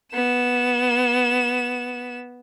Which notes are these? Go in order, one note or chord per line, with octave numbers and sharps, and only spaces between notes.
B3 E7